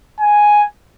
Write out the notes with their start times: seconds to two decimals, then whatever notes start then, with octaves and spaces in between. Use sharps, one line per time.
0.20 G#5